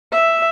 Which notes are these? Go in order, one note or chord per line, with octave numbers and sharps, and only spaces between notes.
E5